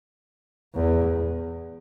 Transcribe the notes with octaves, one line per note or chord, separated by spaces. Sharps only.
E2